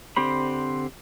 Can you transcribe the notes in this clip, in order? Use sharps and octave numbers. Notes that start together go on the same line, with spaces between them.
D3 C4 G4 C5 B5